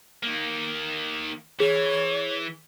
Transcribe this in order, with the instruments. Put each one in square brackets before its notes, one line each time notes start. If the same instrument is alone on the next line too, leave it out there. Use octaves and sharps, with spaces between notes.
[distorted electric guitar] D#3 A#3
[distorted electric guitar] E3 [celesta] G#4 [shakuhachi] C#5